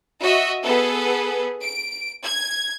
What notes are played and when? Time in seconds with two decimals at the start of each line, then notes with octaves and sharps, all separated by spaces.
0.21 F#4 D#5 E5
0.63 B3 G#4 A4 B4
1.62 D7
2.26 G#6